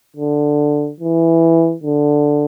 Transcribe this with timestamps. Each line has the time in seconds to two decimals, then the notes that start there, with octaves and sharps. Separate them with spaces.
0.16 D3
1.00 E3
1.84 D3